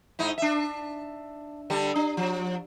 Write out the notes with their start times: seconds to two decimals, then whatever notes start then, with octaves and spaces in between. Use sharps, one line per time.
0.19 G#2 D#4 E4
0.38 D4 E5
1.70 D3 G3 A4
1.96 D4
2.17 F3